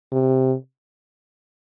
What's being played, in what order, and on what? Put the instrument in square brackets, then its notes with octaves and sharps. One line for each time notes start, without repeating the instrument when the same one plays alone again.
[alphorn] C3